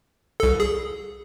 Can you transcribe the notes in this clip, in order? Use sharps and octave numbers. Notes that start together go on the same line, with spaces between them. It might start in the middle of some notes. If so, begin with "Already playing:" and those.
C2 A4
G#4